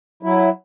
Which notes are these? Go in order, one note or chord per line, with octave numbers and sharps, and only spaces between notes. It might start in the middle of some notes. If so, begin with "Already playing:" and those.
F#3 E4